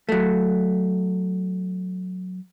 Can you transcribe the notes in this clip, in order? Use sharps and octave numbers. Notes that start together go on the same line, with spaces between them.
F#3 A3